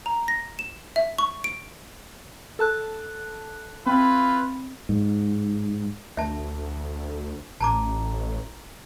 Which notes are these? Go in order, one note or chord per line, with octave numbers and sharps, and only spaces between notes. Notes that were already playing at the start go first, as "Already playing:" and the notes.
A#5
A#6
E7
E5
C#6
D7
A4 A5 F#6
C4 E4 F4 B4
G#2
D2 E5 A5
A1 A5 A#5 D6